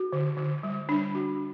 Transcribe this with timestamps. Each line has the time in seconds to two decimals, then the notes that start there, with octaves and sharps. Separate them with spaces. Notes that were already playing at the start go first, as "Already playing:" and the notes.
Already playing: F#4
0.13 D3
0.37 D3
0.63 G3
0.89 D4
1.15 F#4